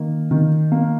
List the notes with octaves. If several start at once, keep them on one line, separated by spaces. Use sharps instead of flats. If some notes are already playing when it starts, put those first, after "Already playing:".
Already playing: D#3 A#3
D#3
A#3